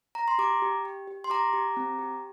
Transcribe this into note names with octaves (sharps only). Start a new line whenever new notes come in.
A#5
C6
G4 A#5 D6
G4
G4
G4
C6
G4 A#5 D6
G4
C4
G4